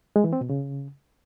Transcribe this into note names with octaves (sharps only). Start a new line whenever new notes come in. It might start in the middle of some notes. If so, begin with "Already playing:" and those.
G#3
E3
C4
B2
C#3